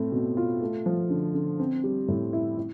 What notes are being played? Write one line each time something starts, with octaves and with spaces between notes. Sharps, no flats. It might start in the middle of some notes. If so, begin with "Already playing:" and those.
Already playing: A2 A3 C4
B2
F4
A3
F3
D3
D3
C4
G3
A2
E4
E4